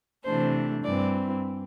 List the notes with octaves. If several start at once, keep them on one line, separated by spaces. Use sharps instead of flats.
C3 E3 A3 D4 C5
G2 E3 C4 D5